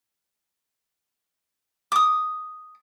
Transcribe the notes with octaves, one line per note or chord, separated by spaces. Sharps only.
D6 D#6